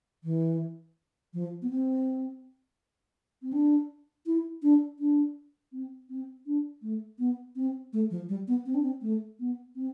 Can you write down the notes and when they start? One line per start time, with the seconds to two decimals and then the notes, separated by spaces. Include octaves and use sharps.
0.24 E3
1.34 F3
1.62 B3
1.70 C4
3.42 C4
3.53 D4
4.26 E4
4.63 D4
4.99 D4
5.72 C4
6.09 C4
6.46 D4
6.82 A3
7.19 B3
7.56 C4
7.93 A3
8.11 F3
8.29 G3
8.48 B3
8.66 C4
8.75 D4
8.83 C4
9.02 A3
9.40 B3
9.76 C4